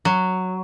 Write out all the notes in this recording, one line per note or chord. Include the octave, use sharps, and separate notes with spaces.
F#3